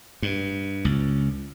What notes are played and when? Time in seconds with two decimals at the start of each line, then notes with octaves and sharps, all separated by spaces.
0.22 G2
0.85 C#2